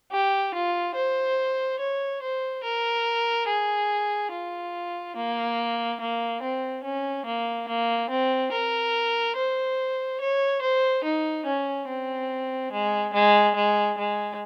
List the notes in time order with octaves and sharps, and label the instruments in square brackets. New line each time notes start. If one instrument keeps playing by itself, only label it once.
[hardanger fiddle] G4
F4
C5
C#5
C5
A#4
G#4
F4
A#3
A#3
C4
C#4
A#3
A#3
C4
A#4
C5
C#5
C5
D#4
C#4
C4
G#3
G#3
G#3
G#3